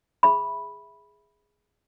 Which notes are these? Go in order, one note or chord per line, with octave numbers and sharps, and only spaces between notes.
G#4 E5 B5